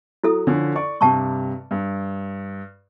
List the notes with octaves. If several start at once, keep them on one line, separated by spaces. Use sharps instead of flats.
F#3 E4 A4 D#6
D3 F3 C#4
D5 C#6
G2 C3 G3 G5 A5 C#6
G2